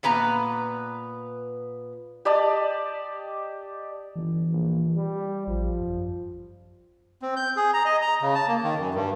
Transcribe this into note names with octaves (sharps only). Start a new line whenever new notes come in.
A#2 B3 B4 A#5
G4 D5 D#5 A5
G1 E3
A#1
G3
A1 F3
F#2
C4
G6
G#4
A#5
D#5
A#5
C#3
A5
A#3
D#3
F#2
G2